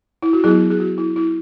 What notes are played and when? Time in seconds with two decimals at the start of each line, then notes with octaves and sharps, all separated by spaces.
0.22 E4
0.33 F#4
0.44 F#3 B3 E4 G#4
0.70 G#4
0.80 F#4
0.98 E4
1.16 E4